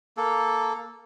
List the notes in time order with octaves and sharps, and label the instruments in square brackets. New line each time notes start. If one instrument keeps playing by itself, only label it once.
[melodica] A#3 A4